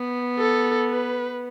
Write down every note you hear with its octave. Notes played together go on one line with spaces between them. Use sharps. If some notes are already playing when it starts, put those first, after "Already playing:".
Already playing: B3
A4
B4